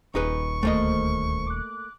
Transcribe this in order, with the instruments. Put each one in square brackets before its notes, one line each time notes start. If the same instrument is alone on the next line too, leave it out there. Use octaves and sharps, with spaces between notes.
[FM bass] D#1 [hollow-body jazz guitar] D#4 G#4 B4 [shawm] C#6
[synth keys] D2 D#3 C5 [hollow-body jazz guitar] A3 A#3 D#5
[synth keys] D6 F#6